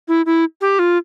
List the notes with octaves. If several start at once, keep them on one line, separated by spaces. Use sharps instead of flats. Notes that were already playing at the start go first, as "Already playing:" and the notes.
E4
E4
G4
F4